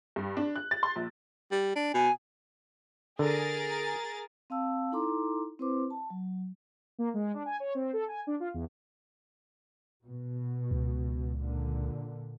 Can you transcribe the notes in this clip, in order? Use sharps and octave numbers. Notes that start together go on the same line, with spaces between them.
G2
D4
F#6
A6
C6
A#1
G3
D4
B2 G#5
D3 G#4 A#4 A6
C4 F5 A5 E6
D#4 E4 A4 A#5 C6 D6
C4 E4 B4 C5 C6 D6
A5
F#3
A#3
G#3
D4
G#5
C#5
C4
A4
G#5
D4
F4
E2
B2
C#2
A#2 D3